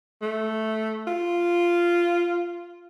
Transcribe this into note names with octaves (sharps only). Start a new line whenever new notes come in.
A3
F4